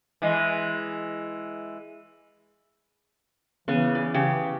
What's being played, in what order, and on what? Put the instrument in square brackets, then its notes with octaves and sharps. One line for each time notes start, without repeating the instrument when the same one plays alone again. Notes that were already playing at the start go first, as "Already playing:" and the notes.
[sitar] E3 G#3
[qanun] C#3 B3 G#5 [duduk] E3
[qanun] D5
[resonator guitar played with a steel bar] C#3 G4